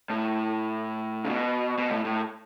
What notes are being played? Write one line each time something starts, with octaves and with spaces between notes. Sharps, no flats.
A2
C#3
B2
B2
A2
A2